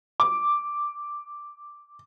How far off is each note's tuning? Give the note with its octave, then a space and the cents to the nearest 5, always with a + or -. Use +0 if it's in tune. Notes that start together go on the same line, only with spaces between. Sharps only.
D6 +0